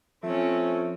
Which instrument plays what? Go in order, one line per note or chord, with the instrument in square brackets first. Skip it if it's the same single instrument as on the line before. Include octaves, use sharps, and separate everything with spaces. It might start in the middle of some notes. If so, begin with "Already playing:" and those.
[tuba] F3 [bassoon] A3 [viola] C4 C#4